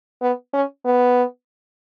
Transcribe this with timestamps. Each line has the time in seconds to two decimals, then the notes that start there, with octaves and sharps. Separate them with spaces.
0.22 B3
0.53 C#4
0.85 B3